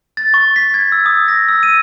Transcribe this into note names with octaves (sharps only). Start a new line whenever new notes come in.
A6
C#6
B6
G#6
E6
D#6
A#6
E6
D#7